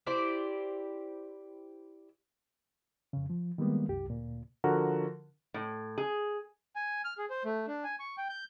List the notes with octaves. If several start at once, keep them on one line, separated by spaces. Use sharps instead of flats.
E4 G4 C5 D5
F2 C#3
F3
D#3 G3 G#3 A#3 B3
C2 F#2 G4
D2 A#2
D3 F3 F#4 A#4
A2
G#4
G#5
F6
G#4
C5
A3
D4
G#5
C#6
G5
G6